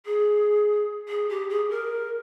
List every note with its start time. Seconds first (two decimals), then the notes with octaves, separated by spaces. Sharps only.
0.05 G#4
1.08 G#4
1.29 G4
1.49 G#4
1.70 A#4